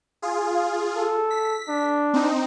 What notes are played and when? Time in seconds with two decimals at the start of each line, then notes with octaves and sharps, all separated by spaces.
0.22 F4 G#4
0.55 F5
0.97 A4
1.30 B6
1.69 D4
2.14 C4 D#4